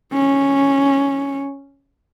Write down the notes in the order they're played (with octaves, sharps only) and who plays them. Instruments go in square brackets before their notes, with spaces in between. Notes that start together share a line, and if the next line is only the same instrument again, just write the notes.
[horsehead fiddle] C#4